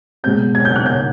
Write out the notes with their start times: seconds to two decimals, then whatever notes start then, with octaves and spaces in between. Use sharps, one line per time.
0.24 B2 G#3 C4 G6
0.55 G#6
0.65 G6
0.76 F#6
0.86 G6